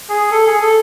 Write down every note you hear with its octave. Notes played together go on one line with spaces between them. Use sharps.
G#4
A4
G#4
A4